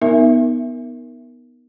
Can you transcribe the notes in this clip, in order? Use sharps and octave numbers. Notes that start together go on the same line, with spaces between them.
B3 D#4 A#4 E5